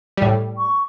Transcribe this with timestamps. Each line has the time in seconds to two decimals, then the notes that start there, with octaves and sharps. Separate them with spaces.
0.17 A2 G3
0.57 C#6